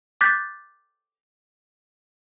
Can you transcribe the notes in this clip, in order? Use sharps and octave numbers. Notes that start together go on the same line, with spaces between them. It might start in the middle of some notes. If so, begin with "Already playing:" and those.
D6 F#6 G6 A6 B6